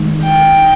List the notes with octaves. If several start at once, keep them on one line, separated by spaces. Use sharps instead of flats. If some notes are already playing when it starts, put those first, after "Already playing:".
Already playing: D#3 G#3 D#4
G5